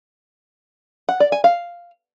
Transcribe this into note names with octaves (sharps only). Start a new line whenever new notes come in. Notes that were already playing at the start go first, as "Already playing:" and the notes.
F#5
D5
G#5
F5